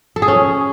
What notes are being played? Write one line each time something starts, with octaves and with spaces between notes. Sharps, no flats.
A4
G#4
C#4